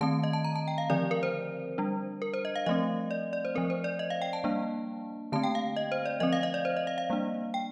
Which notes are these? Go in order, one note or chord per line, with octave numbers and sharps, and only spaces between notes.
D#3 A3 C4 A5
D#5
A5
A#5
A5
G5
F5
D3 F3 C4 D5
A#4
C5
G3 D4
A#4
C5
D#5
F5
F3 A3 C4 D#5
D5
D5
C5
F3 C4 A#4
C5
D5
D#5
F5
G5
A5
G3 A#3 D4
D3 A3 C4 A5
G5
F5
D#5
C5
D5
F3 C4 D#5
F5
D#5
D5
C5
D#5
F5
F5
G3 A#3 D4
G5